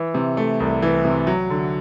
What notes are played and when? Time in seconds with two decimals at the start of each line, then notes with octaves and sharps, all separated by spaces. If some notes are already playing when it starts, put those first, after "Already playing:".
Already playing: E3
0.14 C3
0.37 A3
0.60 C2
0.82 E3
1.05 C3
1.27 F#3
1.50 D3